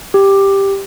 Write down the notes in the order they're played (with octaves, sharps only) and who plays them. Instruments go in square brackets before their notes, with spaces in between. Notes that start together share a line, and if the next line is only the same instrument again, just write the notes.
[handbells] G4